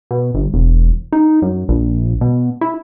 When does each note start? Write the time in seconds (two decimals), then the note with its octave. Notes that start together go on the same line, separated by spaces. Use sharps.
0.11 B2
0.34 G1
0.54 E1
1.13 D#4
1.42 F#2
1.69 A#1
2.21 B2
2.61 E4